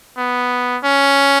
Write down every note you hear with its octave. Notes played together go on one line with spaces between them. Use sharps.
B3
C#4